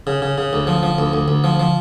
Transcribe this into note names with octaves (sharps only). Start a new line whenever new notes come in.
C#3
C#3
C#3
D2
F3
F3
D2
D2
D2
F3
F3